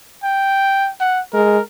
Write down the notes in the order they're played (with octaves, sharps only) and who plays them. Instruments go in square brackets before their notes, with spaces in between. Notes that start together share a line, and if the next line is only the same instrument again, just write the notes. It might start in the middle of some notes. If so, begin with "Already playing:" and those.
[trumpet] G5
F#5
[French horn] G#3 [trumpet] A#4